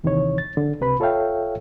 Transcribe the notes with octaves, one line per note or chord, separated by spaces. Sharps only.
D#2 C3 D#3 E3 D#4 C#5
A6
D3
C#2 C3 B4 B5
F4 A4 C#5 E5 F5 G5